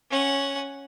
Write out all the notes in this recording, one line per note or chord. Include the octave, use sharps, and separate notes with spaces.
C#4 F#5